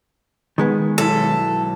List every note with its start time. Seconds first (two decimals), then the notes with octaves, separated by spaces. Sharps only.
0.58 D#3 G#3 B3
0.98 B1 E4 A4